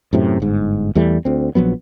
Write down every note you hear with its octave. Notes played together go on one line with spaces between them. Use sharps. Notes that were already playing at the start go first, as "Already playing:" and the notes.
F#2 A2 C3
G1 G#2
E2 E3 G3 A3
D2 C4
A#1 F3 F#3 B3